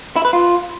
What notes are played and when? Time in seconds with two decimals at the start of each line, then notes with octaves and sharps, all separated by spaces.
0.16 E4
0.25 B4
0.33 F4